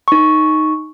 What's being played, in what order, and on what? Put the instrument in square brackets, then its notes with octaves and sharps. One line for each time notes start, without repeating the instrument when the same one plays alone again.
[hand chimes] D#4 C#6